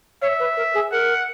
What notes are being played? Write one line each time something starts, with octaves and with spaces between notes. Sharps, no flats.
C#5 E5
B4
A#4
G#4
A#4 F#5